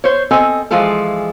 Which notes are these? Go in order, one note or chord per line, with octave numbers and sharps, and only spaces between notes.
C5 C#5
C4 A4 D#5 G#5
E3 F3 G#3 F4 G#4 A4